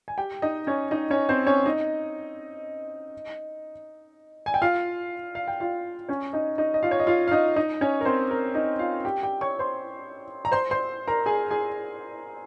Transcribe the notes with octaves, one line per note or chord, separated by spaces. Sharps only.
G#5
G4 G5
D#4 D#5
C#4 C#5
D#4 D#5
C#4 C#5
C4 C5
C#4 C#5
D#4 D#5
G#5
G5
F4 F5
F5
G5
F4 F5
C#4 C#5
D#4 D#5
D#4 D#5
D#5
F4 F5
C#5
D#5
F4 F5
F5
D#4 D#5
D#4 D#5
C#4 C#5
A#4
C4 C5
A#4
D#4 D#5
F4 F5
G4 G5
G4 G5
C#5 C#6
C5 C6
A#5
C5 C6
C5 C6
A#4 A#5
G#4 G#5
G#4 G#5